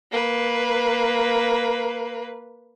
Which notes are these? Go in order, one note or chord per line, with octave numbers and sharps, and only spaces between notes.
A#3 B4